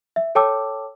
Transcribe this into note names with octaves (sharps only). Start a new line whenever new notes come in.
E5
A4 C#5 G5 A5 D6 E6